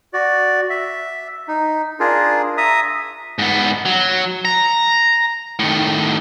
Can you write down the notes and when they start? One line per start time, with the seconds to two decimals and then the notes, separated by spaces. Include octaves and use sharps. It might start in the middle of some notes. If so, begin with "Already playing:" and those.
0.13 F#4 D5
0.70 E5
1.48 D#4
2.00 D4 F4 G#4 A#4
2.58 E5 A#5 D#6
3.39 G#2 B3
3.86 F#3
4.45 A#5
5.59 A2 D#3